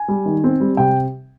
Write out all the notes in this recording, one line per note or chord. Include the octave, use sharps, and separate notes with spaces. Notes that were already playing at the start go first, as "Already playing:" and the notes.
Already playing: G#5
G3
D#3
C4
G3
C3 G5